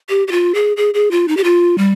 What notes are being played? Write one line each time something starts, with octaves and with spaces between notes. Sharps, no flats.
G4
G4
F4
G#4
G#4
G#4
F4
D#4
G4
F4
G3